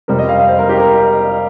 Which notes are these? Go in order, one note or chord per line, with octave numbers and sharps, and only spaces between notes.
F2 C3 G3 C4 A#4
D#5
F5
D#5
C5
A#4
G4
A#4